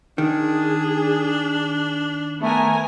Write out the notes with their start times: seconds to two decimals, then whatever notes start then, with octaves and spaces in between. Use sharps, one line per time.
0.18 D#3 D4 G#4
2.42 A3 B3 A#4 G#5